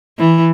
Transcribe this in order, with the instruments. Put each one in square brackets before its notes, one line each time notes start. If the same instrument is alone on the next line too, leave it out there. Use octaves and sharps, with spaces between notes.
[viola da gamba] E3